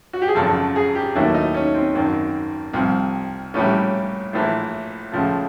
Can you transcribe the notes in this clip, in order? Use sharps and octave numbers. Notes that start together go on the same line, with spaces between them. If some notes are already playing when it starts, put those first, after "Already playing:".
F#4
G4
G#4
G#1 F#2 C#3 F3 A4
G#4
G4
D#2 D#3 F#3 A3 E4
D#4
C#4
C4
G#1 F#2 D#3
C2 C3 F3
A#1 A2 E3 G3 C#4
A#1 A2 E3
C#2 C#3 F3 A3